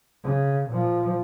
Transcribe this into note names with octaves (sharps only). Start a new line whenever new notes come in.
C#3
A#2 F3